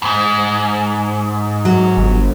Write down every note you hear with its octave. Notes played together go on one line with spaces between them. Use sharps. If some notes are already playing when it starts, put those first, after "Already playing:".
F2 G#2
F#3
G1